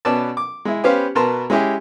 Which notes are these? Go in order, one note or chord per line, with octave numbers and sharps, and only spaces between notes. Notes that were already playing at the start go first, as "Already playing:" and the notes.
B2 C#4 B4 D5 A5
D6
G#3 E4
B3 C#4 G4 B4 C5 F5
B2 A#4 B4 A5 A#5 C6
G#3 C#4 E4 G4 G#4